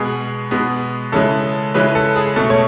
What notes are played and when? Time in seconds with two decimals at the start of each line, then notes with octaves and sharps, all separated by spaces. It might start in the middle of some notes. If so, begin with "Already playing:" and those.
Already playing: B2 G#3 B3 G#4
0.51 B2 G#3 B3
1.12 C#3 E3 G#3 A4
1.74 C#3 E3 G#3 B4
1.95 A4
2.16 G#4
2.36 B2 A3 A4
2.50 C#5